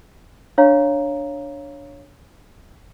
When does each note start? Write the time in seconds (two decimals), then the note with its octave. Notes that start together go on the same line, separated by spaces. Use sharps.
0.58 D4 C#5 F5 A#5